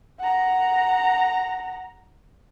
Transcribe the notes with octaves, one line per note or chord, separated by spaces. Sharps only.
F#5 A#5